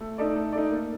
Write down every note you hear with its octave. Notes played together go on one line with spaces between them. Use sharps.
A3
D#4 A4 D5
A3
D#4 A4 D5
A#3